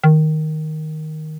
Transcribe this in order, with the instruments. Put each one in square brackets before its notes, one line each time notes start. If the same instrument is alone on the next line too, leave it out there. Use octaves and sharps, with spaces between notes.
[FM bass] D#3